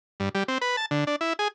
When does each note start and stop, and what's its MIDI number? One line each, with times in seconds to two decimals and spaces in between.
0.20 0.29 43
0.35 0.43 55
0.48 0.58 60
0.61 0.76 71
0.77 0.86 81
0.91 1.04 50
1.07 1.16 62
1.21 1.33 64
1.39 1.48 68